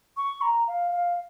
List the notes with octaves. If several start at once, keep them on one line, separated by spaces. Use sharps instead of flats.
C#6
A#5
F5
F5